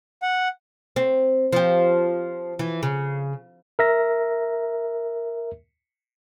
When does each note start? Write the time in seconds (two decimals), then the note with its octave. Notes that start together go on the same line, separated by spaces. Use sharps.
0.22 F#5
0.96 C4
1.53 F3 G4
2.59 E3
2.83 C#3
3.79 A#4 E5 A#6